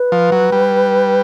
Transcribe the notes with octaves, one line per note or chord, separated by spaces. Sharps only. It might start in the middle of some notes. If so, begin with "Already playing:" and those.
Already playing: B4
F3
F#3
G3